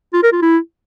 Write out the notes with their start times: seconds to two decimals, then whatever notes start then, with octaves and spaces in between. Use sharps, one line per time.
0.13 F4
0.23 A#4
0.33 F4
0.42 E4